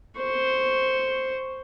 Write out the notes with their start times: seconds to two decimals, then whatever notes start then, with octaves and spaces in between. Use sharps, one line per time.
0.18 C5 C#6